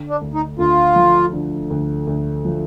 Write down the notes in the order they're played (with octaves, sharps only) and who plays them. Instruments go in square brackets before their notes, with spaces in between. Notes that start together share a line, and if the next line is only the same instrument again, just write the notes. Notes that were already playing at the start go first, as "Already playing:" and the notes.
Already playing: [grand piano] D3
[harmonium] D4
[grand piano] D2
[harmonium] D#4
[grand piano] D2 [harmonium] F4
[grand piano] F3
D3
D2
D2
F3